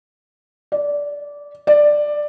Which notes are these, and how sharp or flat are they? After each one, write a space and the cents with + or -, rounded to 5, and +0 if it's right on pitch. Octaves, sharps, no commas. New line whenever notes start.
D5 -15
D5 +10